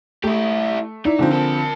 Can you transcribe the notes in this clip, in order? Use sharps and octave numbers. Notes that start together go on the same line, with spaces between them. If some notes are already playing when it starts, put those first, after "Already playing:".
A3 E4 G4
D#4 E4 D5
D3 F3 C4
A#4 A5